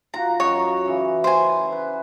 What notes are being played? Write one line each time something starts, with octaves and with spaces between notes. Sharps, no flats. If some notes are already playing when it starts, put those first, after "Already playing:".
F4 F#4 A#5
F#2 C#5 D#5 A#5
C#3 E3
C5 G#5
B4